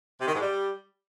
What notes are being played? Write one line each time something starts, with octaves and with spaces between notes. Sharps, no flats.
C3
D#3
G#2
G3